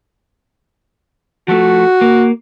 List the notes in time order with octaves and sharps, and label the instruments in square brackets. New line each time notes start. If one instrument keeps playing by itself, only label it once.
[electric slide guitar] F3 A3 [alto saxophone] F#4
[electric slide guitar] A#3